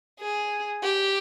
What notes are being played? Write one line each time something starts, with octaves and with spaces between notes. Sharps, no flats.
G#4
G4